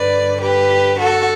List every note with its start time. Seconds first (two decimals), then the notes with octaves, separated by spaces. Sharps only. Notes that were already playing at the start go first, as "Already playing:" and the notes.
Already playing: G2 D3 B4 D5
0.41 G4 B4
0.99 F#4 A4